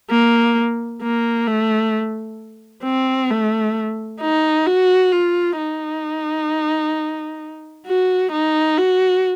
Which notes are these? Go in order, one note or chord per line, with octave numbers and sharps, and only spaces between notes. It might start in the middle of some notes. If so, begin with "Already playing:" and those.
A#3
A#3
A3
C4
A3
D#4
F#4
F4
D#4
F#4
D#4
F#4